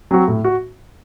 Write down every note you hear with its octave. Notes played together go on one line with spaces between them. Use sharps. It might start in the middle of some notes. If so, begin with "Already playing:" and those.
F#3 C4 F#4
A2
F#4